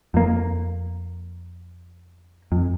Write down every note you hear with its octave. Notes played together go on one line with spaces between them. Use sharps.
F2 A#3
F2